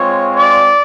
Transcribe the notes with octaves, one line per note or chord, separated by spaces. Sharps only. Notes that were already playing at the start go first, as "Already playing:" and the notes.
Already playing: G#3 C4 F4 C#5
D5